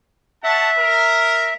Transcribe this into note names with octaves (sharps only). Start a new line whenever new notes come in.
C#5 E5 F#5 A5
A#4